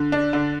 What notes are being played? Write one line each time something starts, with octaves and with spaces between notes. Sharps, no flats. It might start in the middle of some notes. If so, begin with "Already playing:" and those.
Already playing: D3
D4
D3